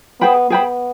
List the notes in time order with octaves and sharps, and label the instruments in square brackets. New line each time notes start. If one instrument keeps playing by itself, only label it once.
[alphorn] B3 [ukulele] G#4 C5 G5 B5
[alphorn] B3 [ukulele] G#4 C5 G5 B5